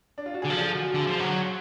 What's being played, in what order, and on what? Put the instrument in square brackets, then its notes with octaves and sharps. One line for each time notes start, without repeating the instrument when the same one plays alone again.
[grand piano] D4
F4
F#4
[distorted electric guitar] D3 [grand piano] G#4
[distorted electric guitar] F3 [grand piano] A4
[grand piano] G#4
F#4
[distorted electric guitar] D3
F3
F#3